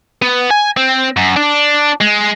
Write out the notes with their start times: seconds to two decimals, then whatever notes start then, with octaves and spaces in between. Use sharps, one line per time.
0.22 B3
0.51 G#5
0.77 C4
1.17 F#2
1.36 D4
2.01 G#3